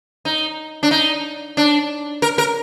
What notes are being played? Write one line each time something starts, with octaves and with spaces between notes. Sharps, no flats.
D#4
D4
D#4
D4
A#4
A#4